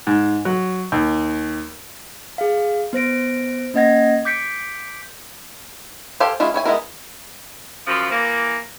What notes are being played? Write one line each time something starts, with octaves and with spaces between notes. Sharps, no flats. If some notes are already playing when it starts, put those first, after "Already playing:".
G#2
F#3
D#2
G#4 F5
B3 C5 A#6 D7
A#3 C#4 D#5 F#5 G#6 A#6
D6 G6 B6 C#7 D7
G4 A4 C5 F5 G#5
G#3 C#4 E4 F4
E4 C#5 G#5
G#3 B3 C4 E4 A#4
F#2 F3
E3 A#3